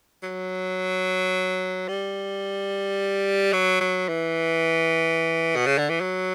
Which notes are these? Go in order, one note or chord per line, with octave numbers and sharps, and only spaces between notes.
F#3
G3
F#3
F#3
E3
B2
C#3
D3
E3
F#3